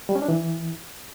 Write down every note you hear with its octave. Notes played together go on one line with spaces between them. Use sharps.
G3
C#4
D4
E3